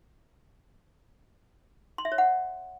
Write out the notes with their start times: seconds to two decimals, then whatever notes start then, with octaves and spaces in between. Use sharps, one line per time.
1.98 C6
2.05 E5
2.12 C#5
2.18 F#5